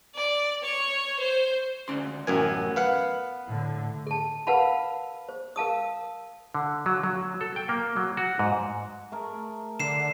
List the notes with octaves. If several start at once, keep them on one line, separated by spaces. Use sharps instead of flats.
D5
C#5
C5
D2 C#4 C6
A1 F#2 B3 A#4 G#5
B4 F5 F#5
A2 D3
A4 A5
A#4 B4 F5 F#5 A5 B5
C5
A#4 F5 A5 D#6
D3
F#3
F#3
A4
G5
A#3
F#3
F#4
G#2
A3 G#4 A#4
D3 C7 E7